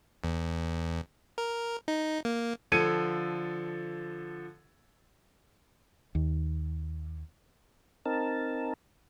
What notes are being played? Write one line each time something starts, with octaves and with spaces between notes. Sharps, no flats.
E2
A#4
D#4
A#3
D3 F3 A4 G#6 C#7 D#7
D#2
C4 D#4 A#4 A5